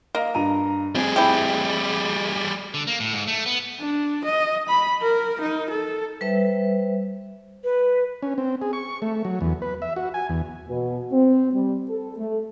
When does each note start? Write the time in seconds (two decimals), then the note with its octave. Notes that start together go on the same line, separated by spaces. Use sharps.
0.15 A#3 D#5 F5
0.34 G2 A#5 D#7
0.95 G3 C4 G#4
1.16 E4 G4
2.74 D3
2.87 A#3
3.00 A2
3.13 G#2
3.28 A3
3.46 B3
3.80 D4
4.25 D#5
4.69 B5
5.02 A#4
5.41 D#4
5.70 A4
6.21 G3 B4 C5 E5
7.64 B4
8.23 C#4
8.38 C4
8.62 G#4
8.73 C#6
9.02 A3
9.25 F#3
9.41 E2
9.62 B4
9.82 E5
9.96 F#4
10.14 G#5
10.29 E2
10.68 B2
11.13 C4
11.54 G3
11.88 A4
12.18 A3